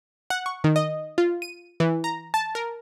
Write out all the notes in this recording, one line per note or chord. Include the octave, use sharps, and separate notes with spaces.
F#5
C#6
D#3
D#5
F4
D#7
E3
A#5
A5
A#4